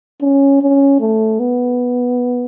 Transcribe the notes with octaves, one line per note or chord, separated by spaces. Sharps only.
C#4
C#4
A3
B3